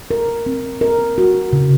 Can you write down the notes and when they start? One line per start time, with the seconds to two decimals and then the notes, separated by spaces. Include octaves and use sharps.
0.11 A#4
0.46 C4
0.81 A#4
1.18 F#4
1.53 C#3